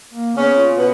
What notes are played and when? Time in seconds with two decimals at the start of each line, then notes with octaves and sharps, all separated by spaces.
0.14 A#3
0.35 C#3 B3 C#4
0.56 F4
0.77 B2 B3 F#4